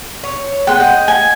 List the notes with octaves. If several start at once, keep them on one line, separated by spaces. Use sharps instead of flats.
C#5
G#3 B3 G5
D#5 F#5
G#5